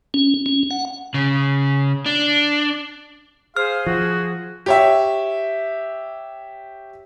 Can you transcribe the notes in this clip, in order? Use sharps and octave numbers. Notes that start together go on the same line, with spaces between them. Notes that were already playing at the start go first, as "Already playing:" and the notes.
C#4
C#4
F#5
C#3
D4
G#4 C5 F5 F6
F3 F#4
G4 C#5 E5